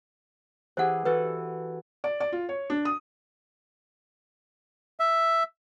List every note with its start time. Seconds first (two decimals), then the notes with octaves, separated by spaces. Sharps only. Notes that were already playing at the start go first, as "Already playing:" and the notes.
0.77 E3 G4 G#4 C5 F#5
1.05 E3 F#4 A4 B4
2.04 D5
2.20 D5
2.32 F4
2.49 C#5
2.70 D4
2.85 D#6
5.00 E5